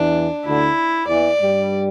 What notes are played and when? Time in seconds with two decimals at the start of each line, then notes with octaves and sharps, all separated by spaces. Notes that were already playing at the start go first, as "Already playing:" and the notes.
Already playing: E2 E3 D4
0.46 D2 D3 E4
1.08 E2 E3 D5
1.40 G2 G3